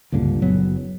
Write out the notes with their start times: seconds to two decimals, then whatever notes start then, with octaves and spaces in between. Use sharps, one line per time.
0.12 C#2 G2 A#2 D3
0.42 F#1 F#3 B3